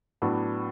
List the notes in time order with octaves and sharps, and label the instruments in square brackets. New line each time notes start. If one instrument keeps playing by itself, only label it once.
[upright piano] A2 F#3 B3 D4